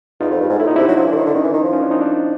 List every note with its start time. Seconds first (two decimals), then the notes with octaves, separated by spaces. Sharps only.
0.21 E2 D#4 F4
0.31 F2
0.40 G2
0.49 G#2
0.59 A2 E4
0.67 A#2 D#4
0.76 C3 D4 E4
0.88 F#3
0.97 F3
1.06 E3
1.12 D3
1.16 D#3
1.26 D3
1.35 D#3 C#4 D#4
1.44 E3
1.54 D#3
1.63 F3
1.72 C#4 D#4
1.82 D4 E4
1.91 C#4 D#4
2.00 C4 D4